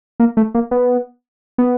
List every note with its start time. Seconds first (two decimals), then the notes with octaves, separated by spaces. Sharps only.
0.20 A#3
0.37 A3
0.55 A#3
0.71 B3
1.58 B3